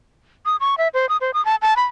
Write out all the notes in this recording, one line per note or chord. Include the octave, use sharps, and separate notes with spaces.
D#6
C#6
E5
C5
D#6
C5
D#6
A5
A5
B5